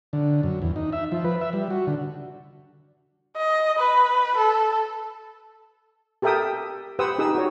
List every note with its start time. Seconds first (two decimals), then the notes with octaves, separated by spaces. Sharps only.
0.13 D3
0.43 F#2
0.62 E2
0.76 D#4
0.93 E5
1.12 F3
1.25 B4
1.41 E5
1.53 G3
1.70 F#4
1.87 D3
3.37 D#5
3.79 B4
4.37 A4
6.22 G4 A4 A#4 E5 G5 D#6
6.99 G4 B4 C5 F#5 D#6 E6
7.19 D#4 G4 G#4 D#6 E6
7.35 F#4 C#5